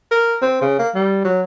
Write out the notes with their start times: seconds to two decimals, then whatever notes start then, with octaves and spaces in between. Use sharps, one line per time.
0.12 A#4
0.42 C4
0.62 C#3
0.79 A#3
0.95 G3
1.25 F#3